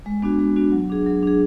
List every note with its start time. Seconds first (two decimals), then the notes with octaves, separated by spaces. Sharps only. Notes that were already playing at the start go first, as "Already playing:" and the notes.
0.06 G#3
0.22 B3 D4 F#4
0.39 G#3
0.56 B3 D4 F#4
0.72 F#3
0.90 D4 G#4
1.06 F#3
1.23 D4 G#4